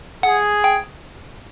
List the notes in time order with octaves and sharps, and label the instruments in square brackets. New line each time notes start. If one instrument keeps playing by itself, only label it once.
[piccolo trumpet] G#4 [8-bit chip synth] F#5
[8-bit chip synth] G5